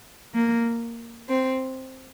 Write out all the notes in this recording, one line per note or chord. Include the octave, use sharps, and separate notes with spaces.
A#3
C4